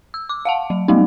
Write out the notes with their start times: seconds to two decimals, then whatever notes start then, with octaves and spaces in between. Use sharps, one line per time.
0.14 E6
0.29 D6
0.45 F5 F#5 A5
0.70 F#3
0.88 F#3 G3 A3 B3 D#4